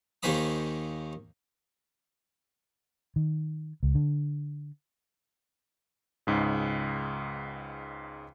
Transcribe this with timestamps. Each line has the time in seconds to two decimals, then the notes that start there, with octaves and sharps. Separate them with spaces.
0.23 D#2 D#3 C#4 C5 B5 D#6
3.16 D#3
3.83 C#2
3.95 D3
6.27 C#2 G#2 C#3